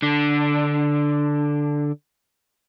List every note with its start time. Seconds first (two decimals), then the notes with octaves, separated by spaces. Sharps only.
0.02 D3 D4